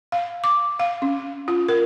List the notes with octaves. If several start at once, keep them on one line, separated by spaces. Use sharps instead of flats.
F5
D6
F5
C#4
F4
A#4